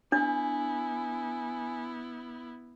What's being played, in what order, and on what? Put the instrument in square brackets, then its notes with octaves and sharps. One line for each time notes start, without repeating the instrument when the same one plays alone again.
[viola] B3 E4 [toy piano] D4 [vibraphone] G#5